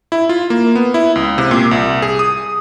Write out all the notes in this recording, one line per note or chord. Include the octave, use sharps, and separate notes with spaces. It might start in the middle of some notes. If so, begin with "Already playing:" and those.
E4
F4
A#3
B3
E4
C#2
C3
A#2
C2
G#4
D#6